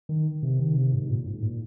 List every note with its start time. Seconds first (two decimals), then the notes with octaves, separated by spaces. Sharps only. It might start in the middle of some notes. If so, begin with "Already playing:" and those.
0.09 D#3
0.43 C3
0.59 D#3
0.76 C3
0.93 G#2
1.09 A#2
1.26 G#2
1.42 A#2